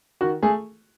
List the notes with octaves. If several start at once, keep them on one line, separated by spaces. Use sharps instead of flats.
D#3 F#4
A3 G#4